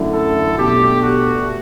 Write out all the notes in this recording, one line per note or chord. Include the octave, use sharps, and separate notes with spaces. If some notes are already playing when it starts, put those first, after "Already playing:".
Already playing: F#2 D3 A3 E4
A4
B2 A3 D4 G4
F#4